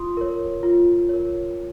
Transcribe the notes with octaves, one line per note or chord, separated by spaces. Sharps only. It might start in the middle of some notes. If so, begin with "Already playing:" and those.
Already playing: F4 C6 D#6
A#4 C#5
F4
A#4 C#5